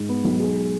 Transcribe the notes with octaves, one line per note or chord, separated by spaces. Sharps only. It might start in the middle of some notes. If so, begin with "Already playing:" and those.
Already playing: G#2
B3
B1
G#3